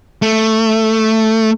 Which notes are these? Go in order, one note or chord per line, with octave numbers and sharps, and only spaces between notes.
A3